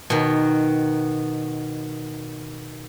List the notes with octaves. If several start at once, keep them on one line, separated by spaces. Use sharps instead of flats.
B2 D#3